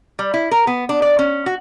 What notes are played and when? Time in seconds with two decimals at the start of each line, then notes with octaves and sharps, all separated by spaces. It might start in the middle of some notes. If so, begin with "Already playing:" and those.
0.19 G3
0.34 E4
0.51 A#4
0.67 B3
0.89 D4
1.02 D5
1.19 C#4
1.46 F#4